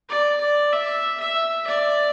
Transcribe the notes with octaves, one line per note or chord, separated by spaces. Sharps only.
D5
D5
E5
E5
D5